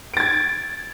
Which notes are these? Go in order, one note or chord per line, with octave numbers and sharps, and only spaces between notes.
G#6 A6 D7